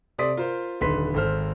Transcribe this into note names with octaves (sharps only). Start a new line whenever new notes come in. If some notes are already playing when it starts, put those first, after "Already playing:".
C3 A4 D5 C6 D#6 B6
F4 A#4 C5
D#1 D3 D#4 B4 C6 B6
G#1 A4 C5 F6